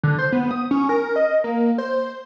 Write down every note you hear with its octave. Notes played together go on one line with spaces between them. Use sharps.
D3
C5
B3
D#6
C#4
A#4
D#5
A#3
C5